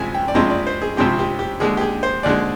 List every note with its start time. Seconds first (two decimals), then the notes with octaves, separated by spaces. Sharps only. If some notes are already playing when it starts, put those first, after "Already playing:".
Already playing: C2 C3 F3 G#3 G#5
0.14 G5
0.28 D5
0.35 C2 C3 F3 G#3 C4 D#5
0.50 D5
0.67 C5
0.82 G#4
0.97 C2 C3 F3 G#3 C4 G4
1.19 G4
1.39 G4
1.60 D#2 D3 G#3 G#4
1.77 G4
1.81 G#4
2.03 C5
2.23 D#2 D3 G#3 D5